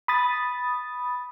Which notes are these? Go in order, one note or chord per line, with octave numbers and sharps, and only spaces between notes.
B5 D#6 A6